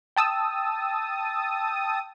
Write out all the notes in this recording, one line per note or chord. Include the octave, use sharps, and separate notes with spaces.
G5 A5 D#6 E6